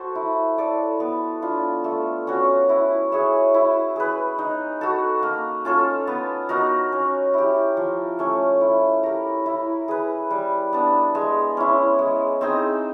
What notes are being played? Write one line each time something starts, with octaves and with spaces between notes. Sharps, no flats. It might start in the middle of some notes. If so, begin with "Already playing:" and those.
Already playing: F#4 A4 C5
E4
A4 D5
B3
D4 F4
A3
C#4 F#4
E4
G#4 C#5 E5
E4
G#4 B4
D#4
F#4 A4
A#3
C#4 F4 A4
B3
D#4 F#4 A#4
C#4
E4 G4
F3
A3 C#4
E4
G4 A#4
E4
G#4 B4
G3
B3 D4
G#3
C#4 E4
G#3
C4 D#4 G#4